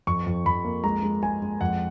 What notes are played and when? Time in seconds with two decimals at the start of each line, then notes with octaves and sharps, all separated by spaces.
0.07 F2 C#6
0.26 F2
0.46 F2 B5
0.64 A#3
0.84 G#3 A#5
1.03 G#3
1.22 G#3 G#5
1.42 G#3
1.61 F2 F#5